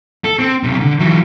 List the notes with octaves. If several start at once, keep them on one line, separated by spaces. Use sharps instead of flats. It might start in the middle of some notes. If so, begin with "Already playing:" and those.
A4
C4
B1 C3
D3
E3 F#3